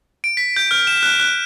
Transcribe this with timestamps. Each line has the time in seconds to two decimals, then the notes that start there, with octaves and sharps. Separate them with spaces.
0.24 D7
0.37 B6
0.56 G6
0.71 F6
0.87 E7
1.03 F#6
1.20 F#6